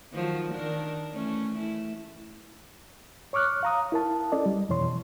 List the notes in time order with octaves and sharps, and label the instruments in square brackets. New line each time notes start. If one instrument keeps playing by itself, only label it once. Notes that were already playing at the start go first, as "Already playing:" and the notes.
[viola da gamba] D#3 F3 F#3
D#3 D4 A#4
E3 A3 C#4
A3 E4
[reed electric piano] C#5 C#6 D6 F6 F#6
F5 A#5 D#6
E4 A#4 A5
C#4 A4 D5 D#5
G3
F2 B2 E3 C#5 C6